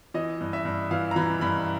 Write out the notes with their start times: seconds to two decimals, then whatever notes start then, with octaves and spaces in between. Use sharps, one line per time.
0.14 E3 D#5
0.41 G2
0.53 E5
0.65 G2
0.91 E3 F5
1.11 A#5
1.16 E3 B5
1.41 G2 B5